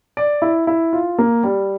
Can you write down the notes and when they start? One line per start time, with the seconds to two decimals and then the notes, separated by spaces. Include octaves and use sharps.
0.17 D5
0.42 E4
0.67 E4
0.93 F4
1.18 A#3
1.43 G3